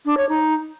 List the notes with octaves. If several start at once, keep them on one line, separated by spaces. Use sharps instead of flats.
D4
C#5
D#4